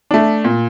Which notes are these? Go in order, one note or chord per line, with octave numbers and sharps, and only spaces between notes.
A3 D4
A#2